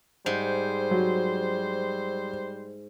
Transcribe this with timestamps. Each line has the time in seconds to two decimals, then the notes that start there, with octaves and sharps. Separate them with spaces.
0.26 G#2 G3 C5
0.91 F#3